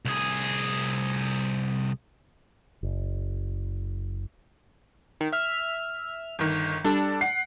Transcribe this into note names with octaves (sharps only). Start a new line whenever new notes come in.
C2 G#4
F#1
D#3
E5 F6
G1 D#3
G3 D4 A4
F#5 C7